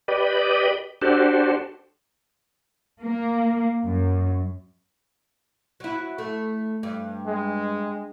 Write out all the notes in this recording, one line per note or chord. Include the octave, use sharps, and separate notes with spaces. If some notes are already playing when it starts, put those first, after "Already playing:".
G4 B4 D5 D#5
D4 F#4 G4 A4 C5
A#3
F#2
F#3 E4
A3
G2
G#3